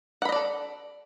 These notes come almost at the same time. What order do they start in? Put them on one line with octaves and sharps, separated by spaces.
F#5 B5 D#5 D5 A4